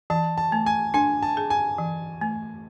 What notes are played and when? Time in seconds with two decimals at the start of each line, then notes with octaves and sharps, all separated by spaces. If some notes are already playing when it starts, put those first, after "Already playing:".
0.10 E3 A5
0.37 A5
0.52 A3
0.66 G#5
0.94 D4 G#5
1.23 A5
1.37 G#4
1.50 G#5
1.78 E3
2.21 A3